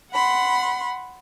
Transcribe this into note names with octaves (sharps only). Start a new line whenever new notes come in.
F#5 B5 C6